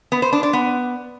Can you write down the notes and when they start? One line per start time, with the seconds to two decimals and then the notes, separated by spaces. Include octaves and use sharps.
0.12 B3
0.22 C5
0.33 D4
0.43 D5
0.53 B3